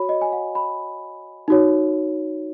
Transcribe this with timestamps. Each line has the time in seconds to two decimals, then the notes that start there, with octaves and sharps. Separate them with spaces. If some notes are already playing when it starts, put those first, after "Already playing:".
Already playing: F#4 C#5 B5
0.09 D#5
0.21 G#5
0.32 F#5
0.55 B5
1.48 D#4 F#4 C#5